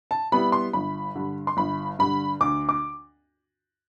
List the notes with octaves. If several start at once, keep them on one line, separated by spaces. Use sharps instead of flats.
A5
G3 B3 E4 B5
C6
G1 B5
G2 D3
C6
G1 B5
G2 D3 B5
D2 D6
D6